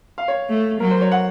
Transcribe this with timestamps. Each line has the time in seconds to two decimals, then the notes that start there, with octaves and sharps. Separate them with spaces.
0.18 F5
0.28 C#5
0.50 A3
0.80 F#3 A#4
0.91 C5
1.01 C#5
1.12 F#5